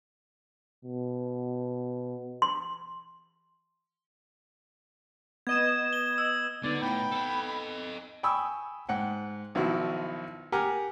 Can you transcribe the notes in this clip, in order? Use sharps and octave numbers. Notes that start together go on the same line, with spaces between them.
B2
C6
B3 D#5 G#6 E7
G7
E6
D3 B3 D#4 D5
A2 G5 B5
A4 D#5
G5 G#5 B5 C#6 D#6 E6
G#2 F#5 G5
B1 D#3 F3 E4 F#4
G4 A#4 F#5 G#5 A#5 F6